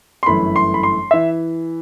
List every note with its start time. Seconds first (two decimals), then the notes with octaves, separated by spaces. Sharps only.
0.23 C6
0.26 G1 F#2 E3 A3 B5
0.56 C6
0.74 B5
0.83 C6
1.11 E3 E5